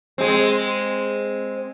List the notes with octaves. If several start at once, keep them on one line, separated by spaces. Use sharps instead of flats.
G#3 C4